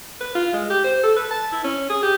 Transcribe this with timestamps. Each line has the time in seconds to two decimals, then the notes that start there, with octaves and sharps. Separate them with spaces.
0.21 B4
0.35 F4
0.53 G#3
0.70 G4
0.84 C5
1.03 A4
1.17 B4
1.31 A5
1.52 E4
1.64 C#4
1.90 G#4
2.03 G4